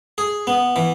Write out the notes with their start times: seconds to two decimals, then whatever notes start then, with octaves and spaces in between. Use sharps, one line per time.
0.18 G#4
0.47 B3
0.76 E3